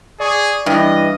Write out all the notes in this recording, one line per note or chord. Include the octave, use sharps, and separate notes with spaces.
G#4 D5 C#6
G2 E3 D#5